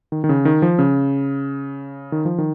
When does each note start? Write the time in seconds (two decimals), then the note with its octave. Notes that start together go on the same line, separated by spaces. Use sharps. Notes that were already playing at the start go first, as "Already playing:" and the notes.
0.12 D#3
0.24 D#3
0.29 C#3
0.45 D#3
0.62 F3
0.79 C#3
2.12 D#3
2.25 F3
2.38 D#3